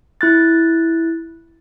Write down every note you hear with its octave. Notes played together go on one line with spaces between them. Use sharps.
E4 F#6 A6